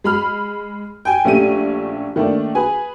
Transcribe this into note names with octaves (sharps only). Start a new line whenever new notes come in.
G#3 B5 F6
G5 G#5
A#1 A3 C#4 G4 D#7
D#3 A3 A#3 D4
G#4 B4 G#5